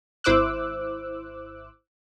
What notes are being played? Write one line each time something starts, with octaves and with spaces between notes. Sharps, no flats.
G#1 E4 C5 D6 E6 F#6